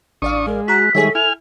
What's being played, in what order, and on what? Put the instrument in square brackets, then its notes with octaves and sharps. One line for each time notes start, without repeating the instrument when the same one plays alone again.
[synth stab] A1 D5 F5 [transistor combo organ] D4 C#6 D#6
[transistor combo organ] G#3 [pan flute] A#4
[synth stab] F#4 A#5 [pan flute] F#6 [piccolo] B6
[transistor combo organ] D#3 G3 G#3 [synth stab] G#4 C#5 E5 [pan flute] A4
[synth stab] E4 [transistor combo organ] G#5 F6 [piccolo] F7